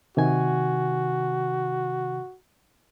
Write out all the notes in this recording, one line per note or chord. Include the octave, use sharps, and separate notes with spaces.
C3 D#3 F#4 G#5